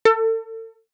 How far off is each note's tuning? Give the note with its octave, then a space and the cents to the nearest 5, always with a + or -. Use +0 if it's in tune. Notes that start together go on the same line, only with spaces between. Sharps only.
A4 +35